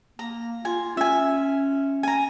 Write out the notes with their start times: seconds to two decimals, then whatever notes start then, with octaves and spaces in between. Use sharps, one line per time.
0.19 A#3 A#5
0.65 F4 G#5
0.97 C#4 E5 G#5
2.03 G#5 A#5